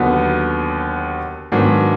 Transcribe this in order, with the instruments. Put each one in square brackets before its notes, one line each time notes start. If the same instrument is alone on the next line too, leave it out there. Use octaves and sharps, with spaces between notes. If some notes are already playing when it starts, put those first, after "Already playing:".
Already playing: [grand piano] D#2 D3 F#3 B3
G#2 D#3 F#3 B3 D4